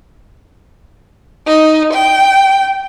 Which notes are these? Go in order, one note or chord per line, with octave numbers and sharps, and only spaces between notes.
D#4
G5